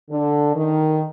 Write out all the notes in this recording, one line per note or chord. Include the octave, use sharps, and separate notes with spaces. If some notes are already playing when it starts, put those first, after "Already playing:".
D3
D#3